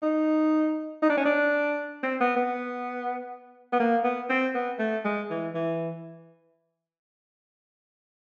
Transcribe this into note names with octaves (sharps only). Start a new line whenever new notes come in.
D#4
D#4
D4
C#4
D4
C4
B3
B3
B3
A#3
B3
C4
B3
A3
G#3
E3
E3